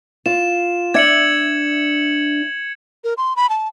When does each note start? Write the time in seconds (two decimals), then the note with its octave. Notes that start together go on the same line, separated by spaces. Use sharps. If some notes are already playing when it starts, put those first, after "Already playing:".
0.26 F4 E7
0.94 D4 E5 G#6 C#7 F#7
3.04 A#4
3.18 C6
3.36 B5
3.49 A5